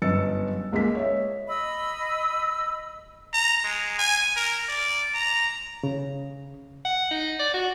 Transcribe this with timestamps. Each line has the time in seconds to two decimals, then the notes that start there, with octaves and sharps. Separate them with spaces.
0.02 G1 F#2 D#5 E6 A6 C#7
0.72 C#2 G#3 A#3 F5 B6
0.95 C#5 D#5 E5
1.47 D#5 B5 E6
3.33 A#5
3.64 G#3
3.98 G#5
4.36 A#4
4.68 D5
5.14 A#5
5.83 C#3
6.85 F#5
7.11 D#4
7.40 D5
7.54 F#4